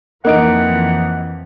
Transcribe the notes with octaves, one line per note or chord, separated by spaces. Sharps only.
F2 E3 F3 A#3 D#4 F#5 D7